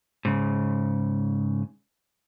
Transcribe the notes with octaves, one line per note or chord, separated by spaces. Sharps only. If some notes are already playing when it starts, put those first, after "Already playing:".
G#2 C#3